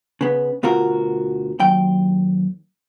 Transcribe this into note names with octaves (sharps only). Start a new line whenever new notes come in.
C#3 B3
D2 B2 F4 F#4 A#4
D#2 F#3 G5